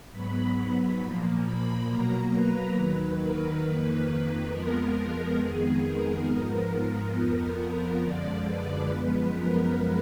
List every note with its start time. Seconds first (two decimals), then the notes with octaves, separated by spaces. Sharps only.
0.12 G#2 F#3 B3 B5
1.00 A#2 F3 A#3
1.43 B5
1.87 B2 F#3 A#3 A#5
2.31 B4
2.75 D#2 D#3 F#3
3.18 A#4
3.62 F2 D#3 A#3 B4
4.06 B4
4.50 F2 F3 G#3 B3 A#4
5.37 F2 D#3 G#3 B3 G#4
5.82 A#4
6.25 G#2 F3 G#3 B3 A#4
7.12 F2 F3 B3
8.00 F#2 D3 F3 G#3 D5
8.44 B4
8.88 F#2 F3 G#3 B3
9.32 A#4